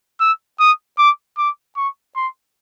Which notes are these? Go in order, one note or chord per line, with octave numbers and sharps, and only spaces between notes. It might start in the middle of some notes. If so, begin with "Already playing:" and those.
E6
D#6
D6
D6
C#6
C6